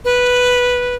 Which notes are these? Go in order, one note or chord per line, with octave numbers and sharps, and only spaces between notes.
B4